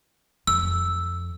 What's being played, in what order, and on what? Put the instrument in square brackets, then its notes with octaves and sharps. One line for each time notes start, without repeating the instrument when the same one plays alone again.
[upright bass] F2 [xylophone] E6